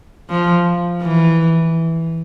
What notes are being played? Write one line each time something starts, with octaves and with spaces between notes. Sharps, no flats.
F3
E3